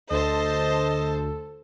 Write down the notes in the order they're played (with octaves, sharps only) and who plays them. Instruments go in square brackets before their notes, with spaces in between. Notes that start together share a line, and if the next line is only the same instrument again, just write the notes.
[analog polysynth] D2 [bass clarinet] A4 [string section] C5 A5 [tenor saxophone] D#5